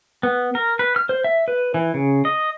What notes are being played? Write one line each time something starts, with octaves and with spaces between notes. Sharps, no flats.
B3
A#4
B4
F6
C5
E5
B4
E3
C#3
D#5